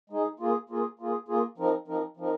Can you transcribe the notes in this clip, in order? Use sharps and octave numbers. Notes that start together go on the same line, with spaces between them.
G#3 D#4 G#4
A#3 F4 G#4
A#3 F4 G#4
A#3 F4 G#4
A#3 F4 G#4
F3 C4 D#4 A#4
F3 C4 D#4 A#4
F3 C4 D#4 A#4